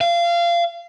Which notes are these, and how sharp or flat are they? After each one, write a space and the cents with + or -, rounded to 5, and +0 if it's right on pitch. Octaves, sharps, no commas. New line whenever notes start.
F5 -25